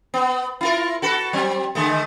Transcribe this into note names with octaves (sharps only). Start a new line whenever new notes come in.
B3
E4 F4 A#4
F#4 A4 B4
F#3 C4
D3 G#3 A3